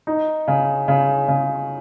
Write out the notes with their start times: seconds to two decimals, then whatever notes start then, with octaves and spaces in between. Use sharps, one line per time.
0.07 D#4
0.48 C#3
0.88 C#3
1.28 C#3